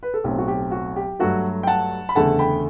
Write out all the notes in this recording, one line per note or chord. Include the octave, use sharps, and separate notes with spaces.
B4
A4
B1 A2 F#3 C4 G4
F#4
G4
F#4
G4
G2 F#3 A3 F#4 A4
G5
F#5 A5
B5
F#1 E2 D3 A3 F#5 A5
G5 B5